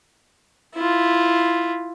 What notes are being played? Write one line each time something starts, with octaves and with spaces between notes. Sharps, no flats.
E4 F4